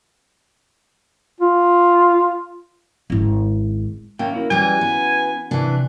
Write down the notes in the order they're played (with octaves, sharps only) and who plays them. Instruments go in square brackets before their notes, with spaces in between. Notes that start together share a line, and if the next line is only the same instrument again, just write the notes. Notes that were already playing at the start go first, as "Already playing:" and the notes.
[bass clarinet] F4
[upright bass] G#1 E4
[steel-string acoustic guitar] A#3 [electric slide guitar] C#4 E5 G5
[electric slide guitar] C#4 E4 F#4
[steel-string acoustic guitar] E3 G3 [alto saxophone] G#5
[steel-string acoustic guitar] B3
[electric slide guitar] C3 G#5 [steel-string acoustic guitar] E3 D4